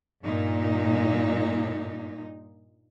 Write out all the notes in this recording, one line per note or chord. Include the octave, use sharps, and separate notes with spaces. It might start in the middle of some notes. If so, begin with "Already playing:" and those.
G2 A#2 D#4